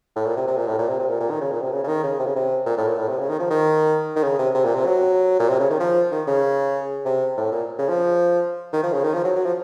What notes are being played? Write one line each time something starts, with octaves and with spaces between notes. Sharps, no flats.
A2
A#2
C3
C3
A#2
A2
A#2
C3
C3
A#2
A#2
D#3
C#3
A#2
C3
C#3
C#3
D#3
C#3
C3
C#3
C3
A#2
A2
A#2
A2
C3
C#3
D#3
F3
D#3
D#3
C#3
C3
C3
A#2
C3
F#3
A#2
C3
C#3
D#3
F3
D#3
C#3
C3
A2
A#2
C#3
F3
D#3
F3
C#3
D#3
F3
F#3
F#3
F3